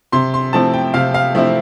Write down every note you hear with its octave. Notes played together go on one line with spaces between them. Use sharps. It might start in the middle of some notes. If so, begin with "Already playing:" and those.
C3 C6
C6
F3 A3 C4 E4 A5
G5
C3 F5
F5
F3 A3 C4 E4 E5